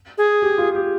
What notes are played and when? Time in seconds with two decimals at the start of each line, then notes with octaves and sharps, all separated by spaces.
0.18 G#4
0.42 G4
0.58 F4
0.75 G4